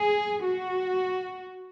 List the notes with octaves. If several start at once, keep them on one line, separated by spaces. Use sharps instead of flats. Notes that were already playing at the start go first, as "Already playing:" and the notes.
Already playing: G#4
F#4